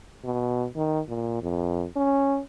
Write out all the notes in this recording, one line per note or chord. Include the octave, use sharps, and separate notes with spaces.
B2
D#3
A#2
F2
C#4